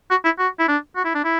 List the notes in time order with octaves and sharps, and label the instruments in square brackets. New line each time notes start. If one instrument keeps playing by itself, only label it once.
[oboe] F#4
E4
F#4
E4
D4
F#4
E4
D4
E4